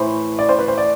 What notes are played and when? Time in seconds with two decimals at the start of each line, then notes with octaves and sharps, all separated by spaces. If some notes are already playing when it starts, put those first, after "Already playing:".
Already playing: A2 E3 A3 C5
0.39 D5
0.49 C5
0.59 B4
0.68 C5
0.78 D5